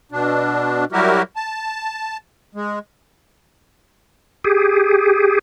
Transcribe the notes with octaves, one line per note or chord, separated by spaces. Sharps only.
B2 D4
F#3 G3 E4 F#4 G4 A#4
A5
G#3
G4 G#4